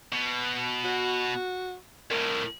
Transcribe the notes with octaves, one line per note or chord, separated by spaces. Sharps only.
B2
F#4
C2 A2 A#4